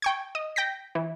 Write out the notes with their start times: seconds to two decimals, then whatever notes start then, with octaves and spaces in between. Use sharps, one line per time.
0.02 G5 C#6 G#6
0.35 D#5
0.56 G5 G6 A#6 B6
0.95 E3